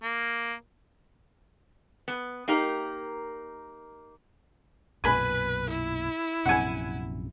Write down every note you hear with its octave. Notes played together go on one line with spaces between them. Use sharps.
A#3
B3
A#3 D#4 G4 A#4
B1 F#2 A#2 B4 G#5 B5
E4
A#1 F#2 C3 F#5 G#5